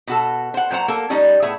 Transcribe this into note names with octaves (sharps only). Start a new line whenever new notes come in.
B2 F#4 A4
C5 F#5
A#2 F#3 C5 F#5 A#5
A#3 A4
F3 G3 C#4 D#4
A2 B3 G#4 E5